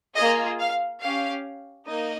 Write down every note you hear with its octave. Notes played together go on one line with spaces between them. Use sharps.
A#3 F4 G#4 D#5
F5
C#4 G4 F5
A#3 D#4 D#5